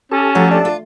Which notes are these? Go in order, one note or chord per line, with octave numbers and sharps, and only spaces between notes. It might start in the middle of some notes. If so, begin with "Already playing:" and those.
C#4 G4 A4 A5
F3 F#3 A3
D4
F4